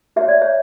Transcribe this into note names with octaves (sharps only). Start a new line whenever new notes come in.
F#4 C#5 E5
D5
C#5 E5